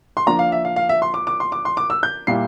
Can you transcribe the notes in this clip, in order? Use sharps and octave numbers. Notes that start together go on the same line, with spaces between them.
C6
F3 A#3 D4 A#5
F5
E5
F5
F5
E5
C6
D6
D6
C6
D6
C6
D6
E6
G6
A#2 G3 A#3 E4 C7